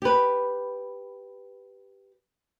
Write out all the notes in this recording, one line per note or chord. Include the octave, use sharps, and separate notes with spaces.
G4 B4